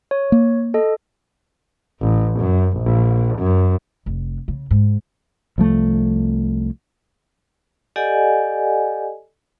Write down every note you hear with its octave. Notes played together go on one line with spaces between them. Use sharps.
C#5
A#3
A4 D#5
A1
F#2
A#1
F#2
F1
C#3
G#2
C2 F3 A3
G4 A4 D5 D#5 F#5 G#5